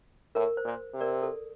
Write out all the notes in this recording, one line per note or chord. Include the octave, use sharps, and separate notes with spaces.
A2 A#4
C5
A#2
C3
A#4 D5
A4